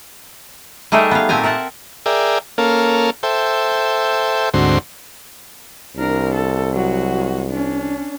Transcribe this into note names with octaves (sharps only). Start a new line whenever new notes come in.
G3 A3 D#4 G#4 A#4 E5
B3 F5
A#2 A3 C4 G4 G#5 A#5
A#4 E5 F#5 A5
G#4 A#4 D5 E5 G5
A#3 C#4 A4 A#4 F5
A4 C5 E5 G5
D2 G#2 D3 C4 F#4 C6
C2 D4 A#4
A4
F#3 F#4
C#4 D4